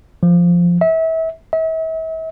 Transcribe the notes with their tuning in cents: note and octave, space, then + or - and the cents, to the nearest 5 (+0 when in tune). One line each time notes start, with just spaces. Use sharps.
F3 -5
E5 -30
E5 -40